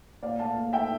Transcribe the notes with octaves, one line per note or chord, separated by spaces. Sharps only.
A#2 D5 F5
A3 F5 A5
A#2
A3 E5 G5